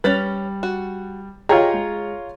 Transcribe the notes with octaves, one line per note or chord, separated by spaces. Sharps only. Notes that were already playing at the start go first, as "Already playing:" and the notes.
G3 C#4 B4 A6
F#4
F4 G4 G#4 C#5 D#5 G5 A#5
G#3